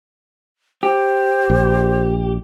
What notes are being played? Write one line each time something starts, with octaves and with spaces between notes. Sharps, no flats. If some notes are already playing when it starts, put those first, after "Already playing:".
G4 C5
A#1